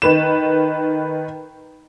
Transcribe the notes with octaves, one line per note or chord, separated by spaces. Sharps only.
D#3 B4 E7